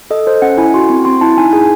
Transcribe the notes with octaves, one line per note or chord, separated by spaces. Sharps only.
A4 D#5
A4 C5
C#4 F#5
E4 G#5
F#4 C6
C4
C4 C6
E4 A5
D#4 G#5
G#4 G#5